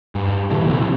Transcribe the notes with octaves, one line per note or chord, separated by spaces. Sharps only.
G2
G2 A#2 D3 E3
A#1 C3